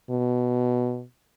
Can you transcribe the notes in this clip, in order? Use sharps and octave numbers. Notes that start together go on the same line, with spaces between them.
B2